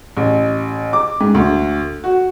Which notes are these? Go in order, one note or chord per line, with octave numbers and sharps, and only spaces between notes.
A1
D6
G#2
D2
F#4